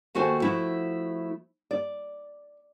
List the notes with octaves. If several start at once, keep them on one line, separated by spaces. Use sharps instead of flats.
D#2 A3 F#4 A4 C5 G#5
F3 A3 E4 F#4
D5